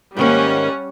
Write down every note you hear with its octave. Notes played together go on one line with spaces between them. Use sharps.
G#2 D#3 G3 A#3 C#4 F#5